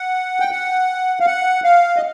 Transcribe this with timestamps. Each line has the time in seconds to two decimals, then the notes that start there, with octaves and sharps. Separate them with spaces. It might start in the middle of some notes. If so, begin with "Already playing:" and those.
Already playing: F#5
0.40 G5
0.51 F#5
1.20 F5
1.27 F#5
1.64 F5
1.96 D#5